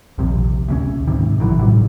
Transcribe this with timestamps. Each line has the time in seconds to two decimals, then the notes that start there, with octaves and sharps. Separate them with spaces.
0.18 D#1 A#1 C3
0.68 D2 A3 C#4
1.07 G#2 C3 D#3
1.39 A#1 D#3 E3 F#3
1.59 A2 C3 F#3 G3